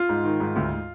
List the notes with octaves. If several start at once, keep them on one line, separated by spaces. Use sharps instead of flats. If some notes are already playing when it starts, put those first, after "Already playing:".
Already playing: F4
G#2
D#3
G#2
D2